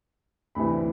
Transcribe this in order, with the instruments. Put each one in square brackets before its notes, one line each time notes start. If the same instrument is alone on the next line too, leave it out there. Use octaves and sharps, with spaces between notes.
[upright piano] D2 C3 E3 B5